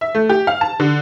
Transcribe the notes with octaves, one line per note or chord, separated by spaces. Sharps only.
E5
A3
G4
F5
A5
D3